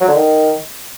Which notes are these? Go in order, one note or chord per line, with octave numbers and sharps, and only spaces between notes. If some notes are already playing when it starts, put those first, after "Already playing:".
F#3
D3
D#3